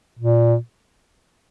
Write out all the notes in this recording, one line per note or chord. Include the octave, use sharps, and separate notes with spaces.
A#2